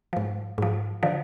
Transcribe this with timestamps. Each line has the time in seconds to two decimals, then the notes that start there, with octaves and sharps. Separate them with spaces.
0.13 G#2 F3
0.58 G#2 F3
1.03 D3 F3